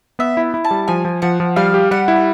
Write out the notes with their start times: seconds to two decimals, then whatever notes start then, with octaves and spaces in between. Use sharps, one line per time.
0.19 B3 E5
0.37 E4
0.54 E4
0.65 A5
0.71 G3
0.88 F3 G#5
1.05 F3
1.22 F3 F#5
1.40 F3
1.56 G3 F5
1.74 G4
1.91 G3 F#5
2.08 E4